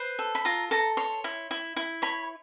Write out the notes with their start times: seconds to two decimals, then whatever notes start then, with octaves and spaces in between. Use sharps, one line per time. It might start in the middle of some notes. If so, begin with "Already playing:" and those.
Already playing: B4 C5
0.19 A4
0.35 B5
0.45 F4 A#5
0.71 A4 A#5
0.97 C#5 C6
1.24 E4
1.51 E4
1.76 E4
2.02 C#5 B5